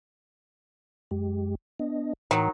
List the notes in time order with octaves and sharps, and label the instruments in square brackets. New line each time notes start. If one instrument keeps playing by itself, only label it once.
[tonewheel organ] F#2 G#3 G4
B3 D4 D#5
[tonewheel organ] A2 E3 [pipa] D#3 F#3